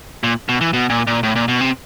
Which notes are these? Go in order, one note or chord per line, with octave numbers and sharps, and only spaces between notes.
A#2
B2
E3
B2
A#2
A#2
A2
A#2
B2
C3